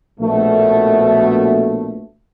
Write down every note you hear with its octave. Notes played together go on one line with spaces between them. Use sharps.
A#1 B2 A3